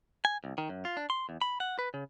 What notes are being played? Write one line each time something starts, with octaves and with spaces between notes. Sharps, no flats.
G#5
C2
D#3
F#2
F4
D4
C6
E2
B5
F#5
B4
C#3